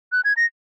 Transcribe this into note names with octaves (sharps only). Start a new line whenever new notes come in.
F#6
G#6
A#6